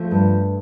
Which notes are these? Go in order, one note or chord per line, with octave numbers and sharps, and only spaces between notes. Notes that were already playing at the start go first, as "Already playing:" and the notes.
Already playing: F3 A3
G2